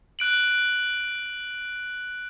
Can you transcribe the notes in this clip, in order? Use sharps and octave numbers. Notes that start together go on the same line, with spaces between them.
F#6 D7 F#7